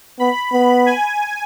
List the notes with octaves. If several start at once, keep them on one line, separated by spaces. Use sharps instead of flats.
B3 B5
B3 B5
G#5